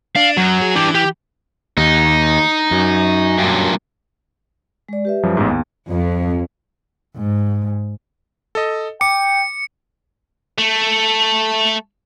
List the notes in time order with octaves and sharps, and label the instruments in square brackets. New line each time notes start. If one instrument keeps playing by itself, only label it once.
[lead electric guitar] D4 [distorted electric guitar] F5
[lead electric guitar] F#2 [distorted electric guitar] F#3
[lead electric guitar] G#4
[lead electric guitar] E3 [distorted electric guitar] D4 G4
[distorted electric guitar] G4
[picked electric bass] D#2 [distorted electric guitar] D#4
[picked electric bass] F#2
[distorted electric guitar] G2 A#2
[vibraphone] G#3 D5
G4 B4 E5
[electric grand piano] F#2 F3 G3
[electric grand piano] A1 G#2 [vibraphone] B3
[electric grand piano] D#2
[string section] F2
[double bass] G#2
[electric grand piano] A4 D#5
[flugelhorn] G5 [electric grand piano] D6 [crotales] C#7
[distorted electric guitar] A3